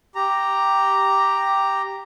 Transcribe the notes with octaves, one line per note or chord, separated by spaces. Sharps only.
G4 A#5